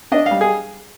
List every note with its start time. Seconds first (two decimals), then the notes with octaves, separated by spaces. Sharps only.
0.12 D4 D#5
0.26 F5
0.31 G3
0.41 G#4